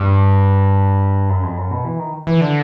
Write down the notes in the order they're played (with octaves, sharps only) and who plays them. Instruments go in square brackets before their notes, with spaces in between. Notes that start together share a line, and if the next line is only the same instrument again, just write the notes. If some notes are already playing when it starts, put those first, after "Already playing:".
Already playing: [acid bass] G2
F#2
F2
F#2
B2
E3
D#3
E3
D3